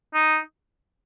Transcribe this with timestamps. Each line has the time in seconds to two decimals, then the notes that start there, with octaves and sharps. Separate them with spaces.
0.14 D#4